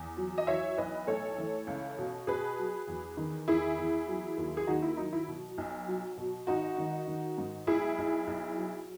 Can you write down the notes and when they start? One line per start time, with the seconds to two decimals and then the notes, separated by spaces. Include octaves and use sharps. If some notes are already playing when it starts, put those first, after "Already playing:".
Already playing: E2
0.17 F#3
0.38 D#5
0.47 E3 C#5 E5
0.78 B1 B4 D#5
1.07 A2 A4 C#5
1.38 E3
1.67 C#2
1.98 B2
2.27 B2 G#4 B4
2.58 F#3
2.88 E2
3.17 D#3
3.48 E2 E4 G#4
3.78 E2
4.08 F#3
4.37 D#2
4.57 G#4
4.67 D#3 D#4 F#4
4.82 E4
4.97 F#3 D#4
5.12 E4
5.28 B2
5.58 B1
5.88 F#3
6.18 B2
6.47 G#1 D#4 F#4
6.78 D#3
7.07 D#3
7.38 G#2
7.67 B1 E4 G#4
7.98 B1
8.27 B1
8.57 F#3